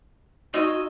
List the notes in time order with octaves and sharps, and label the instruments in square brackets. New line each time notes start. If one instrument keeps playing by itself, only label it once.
[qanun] D#4 F4 G#5 [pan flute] F#4 [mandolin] D#5 E6